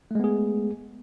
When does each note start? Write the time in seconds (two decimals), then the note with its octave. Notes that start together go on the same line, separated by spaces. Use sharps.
0.11 A3
0.15 G#3
0.20 B3
0.24 G#4